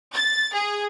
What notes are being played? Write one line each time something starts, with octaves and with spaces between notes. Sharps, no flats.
A6
G#4